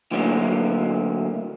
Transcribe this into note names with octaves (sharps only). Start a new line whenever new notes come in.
D2 D3 E3 F#3 G3 A#3